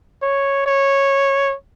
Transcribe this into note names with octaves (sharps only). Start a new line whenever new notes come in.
C#5
C#5